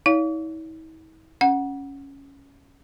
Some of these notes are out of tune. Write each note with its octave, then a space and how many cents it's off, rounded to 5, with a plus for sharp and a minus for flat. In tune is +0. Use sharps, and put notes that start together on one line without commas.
E4 -45 C#5 +40 F5 +0
C#4 +0 F#5 +0